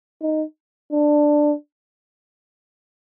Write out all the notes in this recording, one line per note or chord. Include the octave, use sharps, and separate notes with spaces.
D#4
D4